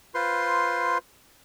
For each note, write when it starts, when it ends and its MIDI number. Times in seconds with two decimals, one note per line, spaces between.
0.15 0.98 65
0.15 0.98 71
0.15 0.98 72
0.15 0.98 84